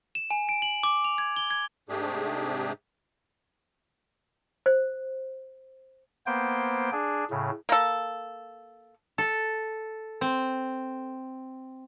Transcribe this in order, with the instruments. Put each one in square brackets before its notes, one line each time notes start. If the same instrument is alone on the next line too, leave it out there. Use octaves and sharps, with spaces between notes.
[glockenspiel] E7
G#5
D7
F#7
D6
F7
G#6
G7
G#6
[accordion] G#2 C3 A3 D4 G4 G#4
[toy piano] C5
[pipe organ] A#3 B3 C5 G5
D4 G#4
A2 C#3
[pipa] A#3 A4
[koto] A4
C4